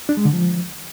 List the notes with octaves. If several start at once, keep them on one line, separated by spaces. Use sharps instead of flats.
D4
G#3
D3
F3